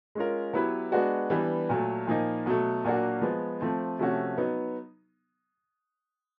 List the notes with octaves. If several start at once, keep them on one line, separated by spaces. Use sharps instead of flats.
G#3 C#4 F4 A#4
F#3 B3 E4 G4 B4
G#3 B3 D4 F#4
E3 G3 B3 D4
A#2 F#3 A3
A#2 F3 A#3 D#4
B2 F#3 A3
A#2 F#3 A#3 D4 F#4
F3 G#3 B3
F3 A3 C4
C3 F3 A3 C#4 F#4
F#3 B3 D#4